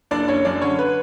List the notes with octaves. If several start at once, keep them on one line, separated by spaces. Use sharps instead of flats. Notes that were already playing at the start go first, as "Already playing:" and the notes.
F#1 D4 D5
F#1 C#4 C#5
F#2 D4 D5
D3 C#4 C#5
B4